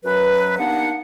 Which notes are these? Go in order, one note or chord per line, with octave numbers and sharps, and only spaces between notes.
F#2 F#3 B4
G3 A#3 B3 D4 D#4 F#5